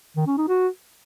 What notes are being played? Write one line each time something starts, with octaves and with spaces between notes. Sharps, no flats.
D#3
C#4
D#4
F#4